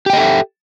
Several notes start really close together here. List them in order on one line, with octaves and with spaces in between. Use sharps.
G4 G5 D#5 A4 E5